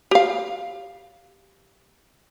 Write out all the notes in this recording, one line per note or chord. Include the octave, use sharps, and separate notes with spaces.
G4 F5